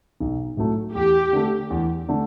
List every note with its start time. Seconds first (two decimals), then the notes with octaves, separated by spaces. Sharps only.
0.20 B1
0.57 A2 F#3 A3
0.95 E2 G4
1.33 D3 A3
1.70 E2
2.09 D3 A3